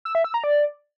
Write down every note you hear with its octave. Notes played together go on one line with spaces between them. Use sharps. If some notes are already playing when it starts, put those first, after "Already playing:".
E6
E5
E6
A#5
D5